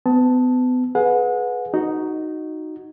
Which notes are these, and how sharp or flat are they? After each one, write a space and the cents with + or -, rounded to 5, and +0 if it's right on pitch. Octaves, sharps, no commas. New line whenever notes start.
B3 +35 A5 +0
G#4 +25 B4 +0 F#5 -30
D#4 +0 F#4 +0